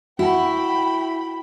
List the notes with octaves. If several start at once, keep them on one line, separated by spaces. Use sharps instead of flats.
E4 F#4 G5 B5